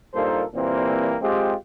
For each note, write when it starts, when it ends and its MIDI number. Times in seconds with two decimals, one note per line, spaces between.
0.14 0.43 43
0.14 0.43 46
0.14 0.43 58
0.14 0.43 63
0.14 0.43 69
0.14 0.43 72
0.54 1.16 46
0.54 1.16 52
0.54 1.16 55
0.54 1.16 58
0.54 1.16 60
1.21 1.54 56
1.21 1.54 60
1.21 1.54 65
1.21 1.54 67